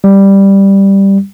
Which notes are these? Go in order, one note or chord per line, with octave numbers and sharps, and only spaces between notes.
G3